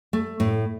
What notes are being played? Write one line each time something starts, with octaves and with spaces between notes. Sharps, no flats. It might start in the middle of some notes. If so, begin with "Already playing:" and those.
A3
A2